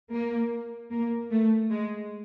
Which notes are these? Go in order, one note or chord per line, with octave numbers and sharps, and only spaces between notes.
A#3
A#3
A3
G#3